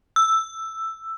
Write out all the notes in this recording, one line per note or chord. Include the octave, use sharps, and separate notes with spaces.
E6